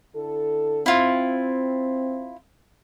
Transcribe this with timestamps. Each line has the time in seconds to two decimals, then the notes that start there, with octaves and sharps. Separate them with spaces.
0.15 D3 E4 A4
0.86 C4 E4 F4